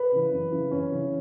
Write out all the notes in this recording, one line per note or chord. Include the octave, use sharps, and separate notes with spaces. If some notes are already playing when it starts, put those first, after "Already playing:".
Already playing: B4
C#3 E3
F#2
C#3 E3
F#2 C#4
C#3 E3